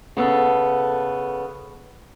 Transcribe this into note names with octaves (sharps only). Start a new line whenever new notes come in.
C#3 B3 A4